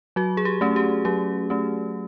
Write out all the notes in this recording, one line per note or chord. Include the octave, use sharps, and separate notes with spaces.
F#3 F#4
G#4
G4
A3 C#4
G4
F#3 G4
A3 C#4